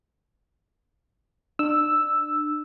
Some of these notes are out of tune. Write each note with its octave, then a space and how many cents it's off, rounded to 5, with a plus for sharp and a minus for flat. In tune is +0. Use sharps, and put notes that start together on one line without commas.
D4 +30 E6 +0